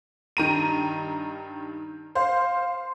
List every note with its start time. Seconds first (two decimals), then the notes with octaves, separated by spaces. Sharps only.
0.37 G2 D#3 A#5 D#7
2.15 C5 F5